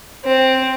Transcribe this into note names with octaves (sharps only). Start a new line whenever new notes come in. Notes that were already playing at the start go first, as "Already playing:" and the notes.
C4